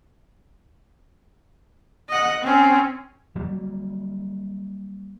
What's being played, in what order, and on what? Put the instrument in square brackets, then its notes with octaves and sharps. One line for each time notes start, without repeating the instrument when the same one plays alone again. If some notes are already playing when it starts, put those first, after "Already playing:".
[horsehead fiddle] D#5 F#5
C4 C#4
[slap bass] F#3 G3 A#3